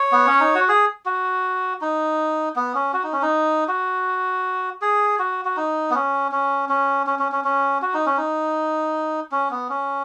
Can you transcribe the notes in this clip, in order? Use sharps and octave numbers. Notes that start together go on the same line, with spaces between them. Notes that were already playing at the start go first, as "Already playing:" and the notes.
Already playing: C#5
B3
C#4
D#4
F#4
G#4
F#4
D#4
B3
C#4
F#4
D#4
C#4
D#4
F#4
G#4
F#4
F#4
D#4
B3
C#4
C#4
C#4
C#4
C#4
C#4
C#4
F#4
D#4
C#4
D#4
C#4
B3
C#4